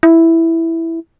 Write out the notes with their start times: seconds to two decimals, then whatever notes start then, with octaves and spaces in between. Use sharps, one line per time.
0.03 E4